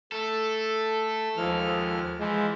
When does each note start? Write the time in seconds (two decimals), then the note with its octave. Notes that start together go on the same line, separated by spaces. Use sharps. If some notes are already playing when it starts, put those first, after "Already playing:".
0.12 A3 A4
1.37 D#2 F3 G#3 F6
2.19 E3 F3 G#3